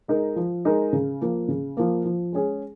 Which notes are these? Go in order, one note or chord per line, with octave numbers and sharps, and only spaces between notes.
G#3 D#4 A#4
F3
G#3 D#4 A#4
C#3
F3 A#3
C#3
F3 A#3
F3
G#3 C#4 G#4